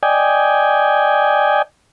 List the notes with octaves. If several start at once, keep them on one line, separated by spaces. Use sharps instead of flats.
D5 D#5 G5 G#5